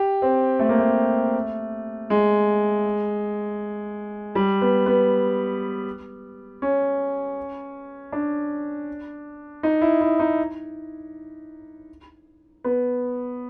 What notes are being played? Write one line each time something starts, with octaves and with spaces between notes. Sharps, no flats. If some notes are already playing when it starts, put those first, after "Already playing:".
Already playing: G4
C4
A3
A#3
A3
G#3
G3
B3
B3
C#4
D4
D#4
E4
E4
D#4
B3